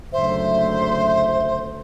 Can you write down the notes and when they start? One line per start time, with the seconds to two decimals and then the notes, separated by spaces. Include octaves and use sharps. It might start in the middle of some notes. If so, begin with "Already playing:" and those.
0.13 F#1 D2 C5 E5